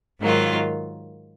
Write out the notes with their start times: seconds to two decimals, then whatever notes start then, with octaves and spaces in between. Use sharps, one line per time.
0.20 G#2 D#3 F#3 A#3 F4